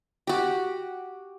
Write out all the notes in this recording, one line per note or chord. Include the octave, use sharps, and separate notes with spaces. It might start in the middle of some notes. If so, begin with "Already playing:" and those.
F#4 G4